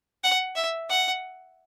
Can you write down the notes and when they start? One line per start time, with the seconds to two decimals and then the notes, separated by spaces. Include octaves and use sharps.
0.24 F#5
0.56 E5
0.89 F#5